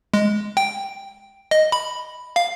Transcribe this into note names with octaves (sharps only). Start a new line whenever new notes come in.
G#3
G5
D#5
B5
F5